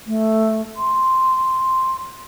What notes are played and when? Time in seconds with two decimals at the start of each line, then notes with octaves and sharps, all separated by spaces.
0.06 A3
0.76 C6